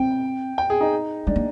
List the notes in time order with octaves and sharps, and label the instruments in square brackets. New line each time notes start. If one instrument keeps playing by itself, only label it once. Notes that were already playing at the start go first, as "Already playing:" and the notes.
Already playing: [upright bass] C4 [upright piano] G5
[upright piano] G5
G#4
D#4
[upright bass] G#3 [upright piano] D4
[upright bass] A#3